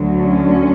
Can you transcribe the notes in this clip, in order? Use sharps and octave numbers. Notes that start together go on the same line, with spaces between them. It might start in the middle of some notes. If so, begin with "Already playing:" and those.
Already playing: D2 D3 F#3
C#4